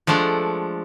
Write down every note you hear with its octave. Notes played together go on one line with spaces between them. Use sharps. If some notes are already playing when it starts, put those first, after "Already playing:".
F3 G#3 A3 D4 F#5